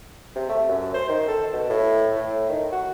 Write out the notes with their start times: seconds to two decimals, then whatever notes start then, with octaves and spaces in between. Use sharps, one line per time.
0.36 C3
0.49 A3
0.68 F#2
0.94 C5
1.09 D#3
1.28 A4
1.53 B2
1.70 A2
2.15 A2
2.49 D#3
2.72 F#4